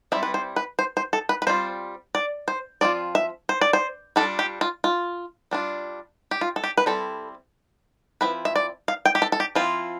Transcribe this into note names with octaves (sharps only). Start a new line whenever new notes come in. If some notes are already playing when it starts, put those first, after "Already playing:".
G3 C4 E4 E5
B4
C5
B4
C5
C5
A4
B4
B4
G3 C4 F4 C5
D5
C5
F3 C4 F4 D5
E5
C5
D5
C5
G3 D4 F4 A4
G4
F4
F4
G3 D4 F4
G4
F4
A4
G4
B4
G3 C4 E4 A4
F3 C4 E4 B4
E5
D5
F5
G5
G4
A4
A4
G4
F3 C4 E4 F4